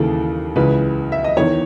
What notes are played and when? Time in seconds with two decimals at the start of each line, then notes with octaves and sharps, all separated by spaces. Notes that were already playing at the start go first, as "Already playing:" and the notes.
Already playing: D#2 C#3 E3 A4
0.56 C#2 C#3 E3 B4
1.12 E5
1.24 D#5
1.37 E2 D#3 C#5